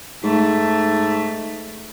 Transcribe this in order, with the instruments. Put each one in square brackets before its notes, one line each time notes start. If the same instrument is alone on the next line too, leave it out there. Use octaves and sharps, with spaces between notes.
[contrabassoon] G#2 [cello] A3